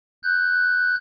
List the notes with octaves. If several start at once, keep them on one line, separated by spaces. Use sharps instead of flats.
F#6 G6